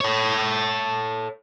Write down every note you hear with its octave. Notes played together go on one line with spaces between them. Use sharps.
A4 C#5